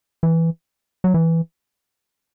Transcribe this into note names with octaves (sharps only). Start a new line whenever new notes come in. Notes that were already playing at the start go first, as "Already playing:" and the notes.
E3
F#3
E3